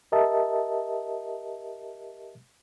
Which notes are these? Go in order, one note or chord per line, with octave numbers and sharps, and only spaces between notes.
G4 A#4 D#5 E5 A5